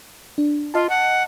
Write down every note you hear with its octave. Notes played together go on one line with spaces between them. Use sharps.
D4
F4 D#5 A5
F#5